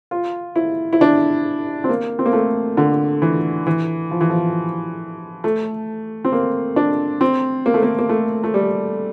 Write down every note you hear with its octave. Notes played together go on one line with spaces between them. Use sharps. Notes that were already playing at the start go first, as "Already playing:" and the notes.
F4
E4
E4
D4
C4
A#3
C4
A#3
A3
D3
E3
E3
F3
E3
F3
A3
C4
A#3
D4
C4
A#3
A3
A#3
A#3
A3
A3
G3